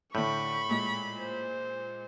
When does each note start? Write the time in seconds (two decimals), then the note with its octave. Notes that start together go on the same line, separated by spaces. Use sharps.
0.15 A2 D3 D4 B5 C#6 G6
0.69 A#2 G#3
1.19 C5